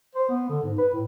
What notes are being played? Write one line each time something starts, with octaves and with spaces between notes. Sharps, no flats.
C5
B3
D3
G#2
B4
A2